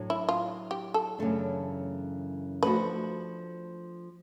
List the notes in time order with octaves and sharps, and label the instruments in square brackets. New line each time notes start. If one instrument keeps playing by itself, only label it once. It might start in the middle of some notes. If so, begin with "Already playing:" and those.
Already playing: [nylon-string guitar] A2 F#3 A3 D4
[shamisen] E4
F4
G4
A4
[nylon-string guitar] F#2 C#3 E3 A3 D4
[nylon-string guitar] F3 A3 D4 F#4 [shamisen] B4